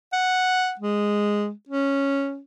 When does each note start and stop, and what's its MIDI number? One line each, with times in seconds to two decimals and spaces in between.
0.13 0.74 78
0.79 1.50 56
1.69 2.39 61